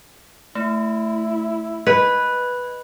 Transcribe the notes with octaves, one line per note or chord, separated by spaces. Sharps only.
A3 E4
B4 D#5